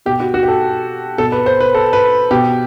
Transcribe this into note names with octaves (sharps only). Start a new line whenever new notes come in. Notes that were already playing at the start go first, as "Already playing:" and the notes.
B2 G4
F#4
F#4
G4
A4
B2 A4
B4
C5
B4
A4
B4
B2 G4